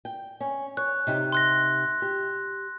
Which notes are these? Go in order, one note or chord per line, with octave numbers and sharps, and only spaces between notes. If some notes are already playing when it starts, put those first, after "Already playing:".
G5
C#4
C#5 F#6
C3 D#4 G4
C6 F#6 A#6
G4